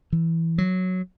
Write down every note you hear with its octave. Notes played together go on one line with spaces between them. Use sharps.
E3
F#3